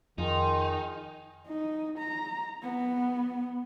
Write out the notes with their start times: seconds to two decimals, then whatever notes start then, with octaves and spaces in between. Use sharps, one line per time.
0.18 F2 D#3 D#4 F4 G#4
1.48 D#4
1.98 A#5
2.62 B3